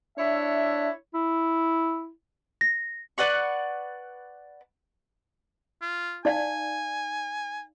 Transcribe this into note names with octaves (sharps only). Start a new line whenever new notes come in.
D4 E4 C#5 E5
E4
A#6
B4 D5 F#5 C#6
F4
D#4 D5 F5 G#5